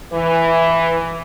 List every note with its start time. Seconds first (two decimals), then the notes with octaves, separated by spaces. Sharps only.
0.13 E3